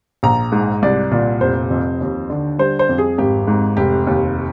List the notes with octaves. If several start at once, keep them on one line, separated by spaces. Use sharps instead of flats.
A#1 A#5
G#2
C2 D5
A#2 D5
F1 C5
F2
D#2
D3
G3 C5
C5
F2
G#4
G#1 G4
G#2
F1 G4
D#2